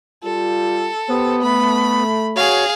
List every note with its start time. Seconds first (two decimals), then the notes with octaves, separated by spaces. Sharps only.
0.24 G3 F4 A4
1.09 B3 G4 C5
1.42 A3 B5
2.36 F#4 G#4 C#5 F5